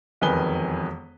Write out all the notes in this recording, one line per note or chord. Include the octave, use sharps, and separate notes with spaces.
E1 F2 D#3 B4 G#5 G7